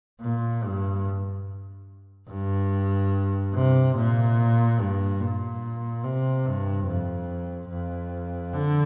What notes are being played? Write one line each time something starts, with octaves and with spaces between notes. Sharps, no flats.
A#2
G2
G2
C3
A#2
G2
A#2
C3
G2
F2
F2
D3